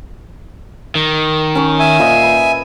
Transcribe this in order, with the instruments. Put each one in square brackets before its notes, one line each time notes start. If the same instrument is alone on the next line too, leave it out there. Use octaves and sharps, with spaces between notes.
[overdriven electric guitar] D#3
[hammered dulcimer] C#4 C#5
[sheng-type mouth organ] E5 G#5
[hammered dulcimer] A#2 C5 D#5
B4